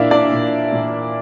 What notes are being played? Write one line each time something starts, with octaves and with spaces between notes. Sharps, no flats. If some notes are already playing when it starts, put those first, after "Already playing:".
Already playing: A#2 A#3 D4 E4 D5 E5 F5
D4 D5
A#2
A#2